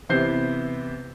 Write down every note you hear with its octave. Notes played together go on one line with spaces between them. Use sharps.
C3 E3 B3 C5 G6 C7